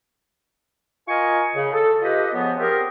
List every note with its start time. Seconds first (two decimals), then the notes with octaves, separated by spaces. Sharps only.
1.07 F4 A#4 D#5 G#5 C#6
1.55 C#3
1.73 A4
2.02 F4 G4 B4 D#5
2.33 C#3 F3 B3
2.58 C4 G4 G#4 A#4